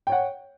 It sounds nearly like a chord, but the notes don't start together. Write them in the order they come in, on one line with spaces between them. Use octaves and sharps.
G5 C#5 F#5